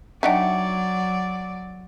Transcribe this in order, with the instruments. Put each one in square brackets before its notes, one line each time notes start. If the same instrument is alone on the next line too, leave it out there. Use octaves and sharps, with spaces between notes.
[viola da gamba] F#3 D5 [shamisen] D4 D#4 [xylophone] E5 F#5 G5